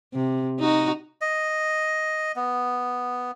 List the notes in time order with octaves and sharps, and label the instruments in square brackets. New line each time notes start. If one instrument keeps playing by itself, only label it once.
[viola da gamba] C3
D#4 F#4
[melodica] D#5
B3